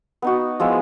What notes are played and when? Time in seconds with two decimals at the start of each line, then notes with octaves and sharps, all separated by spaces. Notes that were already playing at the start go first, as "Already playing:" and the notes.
0.22 B3 D#4 F#4
0.60 F3 G#3 B3 E4